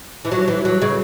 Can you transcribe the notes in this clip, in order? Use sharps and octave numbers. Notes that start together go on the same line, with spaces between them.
E3
F#3
E3
F#3
C#3